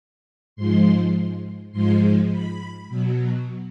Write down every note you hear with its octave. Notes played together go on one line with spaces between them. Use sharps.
G#2 F3 G#3 C6
G#2 F3 G#3 C6
B5
B2 F#3